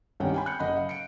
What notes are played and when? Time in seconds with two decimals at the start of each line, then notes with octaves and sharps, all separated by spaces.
0.20 C2 G2 D#3 C#4 F#5 G5
0.34 G5 G#5 B5
0.46 F#6 G6 C#7
0.59 F#1 D#5 F#5 B5
0.77 F5
0.89 C#7 D7